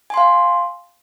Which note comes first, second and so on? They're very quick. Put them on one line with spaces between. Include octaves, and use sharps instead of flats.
G#5 C6 F5